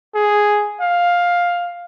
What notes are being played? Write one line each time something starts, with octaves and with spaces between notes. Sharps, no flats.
G#4
F5